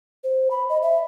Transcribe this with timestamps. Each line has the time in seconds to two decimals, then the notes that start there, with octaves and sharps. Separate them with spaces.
0.24 C5
0.51 B5
0.69 D#5
0.82 E5